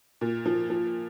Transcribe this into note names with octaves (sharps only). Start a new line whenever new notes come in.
A#2
F3
F3